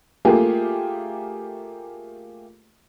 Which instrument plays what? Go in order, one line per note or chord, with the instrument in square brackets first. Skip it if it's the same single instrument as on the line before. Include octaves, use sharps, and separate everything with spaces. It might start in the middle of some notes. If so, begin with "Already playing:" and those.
[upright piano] A3 A#3 F4 G4 G#4